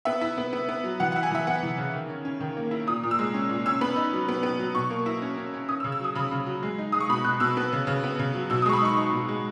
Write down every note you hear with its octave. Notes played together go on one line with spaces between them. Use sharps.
B3 E5
E4
B3
B3
B3
F#3
E3 F#5
F#5
E4
G#5
E3 E5
B3 F#5
E3
C#3
D#3
C#4
C#4
D#3
A#3
E4
A#2 D#6
A#2
E6
G#3
C#4
A#2
C#4 E6
B3 B5
D#4
F#3
B3
B3
F#3
B2 C#6
A#3
E4
C#4
C#4
C#4
C#4 D#6
E6
C#3
E6
F#3 D#6
C#3 B5
C#3
F#3
G#3
D#4
G#3 D#6
C#6
B2 B5
B2 F#6
B2 E6
B3
C#3
C#3
B3
C#3
F#3
B2 E6
D#6
G#3 C#6
B5
D#4 C#6
D#4
B2
G#3